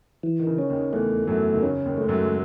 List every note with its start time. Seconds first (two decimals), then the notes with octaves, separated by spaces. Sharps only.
0.23 E3
0.39 D#3
0.47 C#3
0.58 C#4
0.70 D#2 D#3
0.93 E2 E3 A3
1.27 F#2 F#3 A3
1.54 D#3
1.63 C#3 C#4
1.85 D#2 D#3
1.97 G#3 A3
2.08 F#2 F#3
2.22 G#3